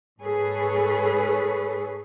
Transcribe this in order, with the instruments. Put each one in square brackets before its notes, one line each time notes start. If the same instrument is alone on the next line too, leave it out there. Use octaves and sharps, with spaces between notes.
[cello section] G#2 G#4 A4 B4 C#5